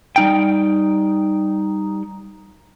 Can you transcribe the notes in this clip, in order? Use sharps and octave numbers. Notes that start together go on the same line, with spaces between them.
G3 D#4 G5